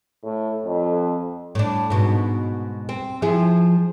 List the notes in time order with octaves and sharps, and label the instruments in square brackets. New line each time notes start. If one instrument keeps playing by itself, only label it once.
[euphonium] A2
F2
[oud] A2 D4
G#2 B2
C4
F3 E4 G#4